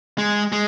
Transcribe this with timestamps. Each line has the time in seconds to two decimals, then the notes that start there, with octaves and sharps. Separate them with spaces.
0.18 G#3
0.52 G#3